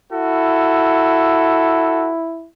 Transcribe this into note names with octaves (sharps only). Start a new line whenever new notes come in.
E4 F#4 A4